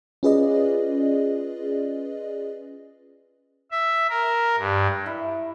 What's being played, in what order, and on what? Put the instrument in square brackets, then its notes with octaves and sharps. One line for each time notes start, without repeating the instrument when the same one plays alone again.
[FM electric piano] C#4 F4 G#4 B4 D5 D#5
[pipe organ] E5
A#4
G2
[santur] E4